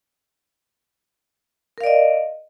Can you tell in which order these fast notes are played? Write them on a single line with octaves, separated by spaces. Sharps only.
A#4 F5 D5 D#5